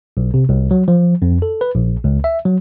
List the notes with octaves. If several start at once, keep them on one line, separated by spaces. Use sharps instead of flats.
B1
C3
C2
F#3
F3
F2
A4
B4
A#1
C#2
E5
F#3